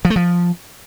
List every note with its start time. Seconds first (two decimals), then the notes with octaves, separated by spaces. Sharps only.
0.05 F3
0.10 A3
0.16 F3